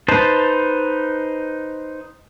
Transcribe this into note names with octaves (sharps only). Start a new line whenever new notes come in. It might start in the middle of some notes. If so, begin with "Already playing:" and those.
D#4 B4 C5 A5